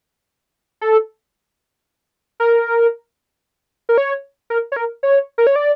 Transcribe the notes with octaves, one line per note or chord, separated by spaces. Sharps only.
A4
A#4
A#4
C#5
A#4
C#5
A#4
C#5
A#4
C#5
D5